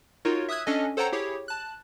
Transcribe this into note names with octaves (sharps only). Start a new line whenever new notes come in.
D#4 F4 F#4 A#4 C#5
E5 D#6 E6 F#6 G#6
C#4 D4 A4 D#5 G#5
A4 C5 C#5 F#5 G5 A#5
E4 G4 G#4 C#5
A5 F#6